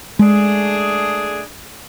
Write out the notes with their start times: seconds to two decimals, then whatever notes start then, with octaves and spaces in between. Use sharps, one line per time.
0.18 G#3 A3 D4 G#4